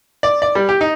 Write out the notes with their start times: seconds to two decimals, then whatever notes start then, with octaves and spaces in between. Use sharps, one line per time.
0.23 D5
0.42 D5
0.55 G3
0.69 G4
0.81 D#4